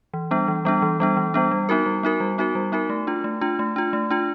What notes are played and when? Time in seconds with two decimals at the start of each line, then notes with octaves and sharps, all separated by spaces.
0.14 E3
0.31 G3 B3 D4
0.48 E3
0.65 G3 B3 D4
0.82 E3
1.00 G3 B3 D4
1.17 E3
1.34 G3 B3 D4
1.51 G3
1.69 B3 D#4 F#4 A#4
1.86 G3
2.03 B3 D#4 F#4 A#4
2.20 G3
2.38 B3 D#4 F#4 A#4
2.55 G3
2.72 B3 D#4 F#4 A#4
2.90 A3
3.07 D4 F4
3.24 A3
3.41 D4 F4
3.59 A3
3.76 D4 F4
3.93 A3
4.11 D4 F4